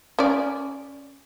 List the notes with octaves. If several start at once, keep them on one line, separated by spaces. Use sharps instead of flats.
C#4 D5